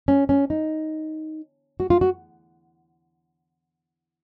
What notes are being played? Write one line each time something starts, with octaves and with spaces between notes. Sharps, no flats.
C#4
C#4
D#4
F#4
F4
F#4